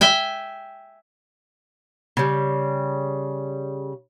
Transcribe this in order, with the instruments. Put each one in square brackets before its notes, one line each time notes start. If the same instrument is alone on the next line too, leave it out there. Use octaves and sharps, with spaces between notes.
[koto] E5 G5 G#5
[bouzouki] C#3 G3